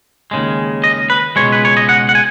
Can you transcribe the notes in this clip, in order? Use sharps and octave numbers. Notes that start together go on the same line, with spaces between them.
D#2 C#3 G#3
D#5
B4
C#2 B2 G#3 C#5
B4
C#5
D#5
F#5
F#5
G#5